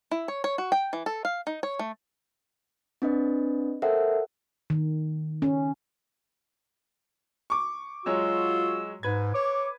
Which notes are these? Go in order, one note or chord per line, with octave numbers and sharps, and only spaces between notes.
E4
C#5
C#5
F#4
G5
E3
A4
F5
D#4
C#5
A3
C4 D4 B4 D#5
A4 A#4 C5 E5 F#5 G5
D#3
C#4
C#6 D6
F#3 G#3 F4 F#4 C#5 E6
G#2 B4 G#6
C#5 D6